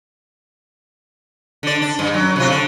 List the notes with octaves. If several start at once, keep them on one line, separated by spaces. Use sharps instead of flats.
D3 D5
D4
G2
F#2 F#3
C3 F#3 F4
D3